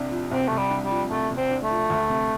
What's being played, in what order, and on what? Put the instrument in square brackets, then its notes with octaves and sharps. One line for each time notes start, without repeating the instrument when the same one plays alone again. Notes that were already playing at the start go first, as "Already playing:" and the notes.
Already playing: [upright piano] C2 C3 D4
F3
[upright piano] C2 [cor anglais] C4
[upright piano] C3 [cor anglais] A3
[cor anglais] G3
[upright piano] D4
[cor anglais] G3
[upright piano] F3
[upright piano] C2 [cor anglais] A3
[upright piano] C3
[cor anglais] C4
[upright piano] D4
[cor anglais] A3
[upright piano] F3
D2
C3